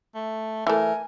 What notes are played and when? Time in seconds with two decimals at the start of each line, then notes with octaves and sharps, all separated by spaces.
0.15 A3
0.67 E3 A3 A#4 G#5